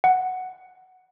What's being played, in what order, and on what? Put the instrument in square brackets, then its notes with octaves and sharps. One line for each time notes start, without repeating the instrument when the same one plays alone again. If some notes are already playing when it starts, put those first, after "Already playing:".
[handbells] F#5